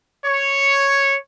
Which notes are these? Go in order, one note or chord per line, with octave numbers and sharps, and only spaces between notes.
C#5